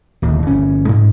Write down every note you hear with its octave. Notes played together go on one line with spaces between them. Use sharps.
D1 D#2
G1 C#4
G#2